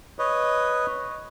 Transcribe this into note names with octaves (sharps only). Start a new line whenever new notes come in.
B4 C#5 D#5